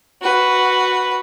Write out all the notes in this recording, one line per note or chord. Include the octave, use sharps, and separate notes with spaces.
F#4 B4